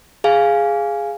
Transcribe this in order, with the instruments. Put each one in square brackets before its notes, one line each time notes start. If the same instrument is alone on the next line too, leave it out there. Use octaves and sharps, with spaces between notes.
[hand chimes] G#4 F5 G#5